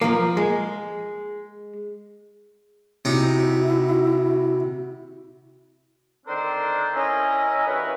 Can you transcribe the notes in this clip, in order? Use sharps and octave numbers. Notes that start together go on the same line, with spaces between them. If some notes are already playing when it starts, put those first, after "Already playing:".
F3 A#3
G#3
C3 D#4 E4 F#4
D3 D#3 C4 D4 A#4 C5
C#4 E4 A#4 D#5
G2 E3 F#4 A#4 B4